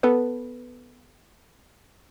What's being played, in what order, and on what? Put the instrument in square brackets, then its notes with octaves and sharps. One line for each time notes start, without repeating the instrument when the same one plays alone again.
[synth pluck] B3 A4 B4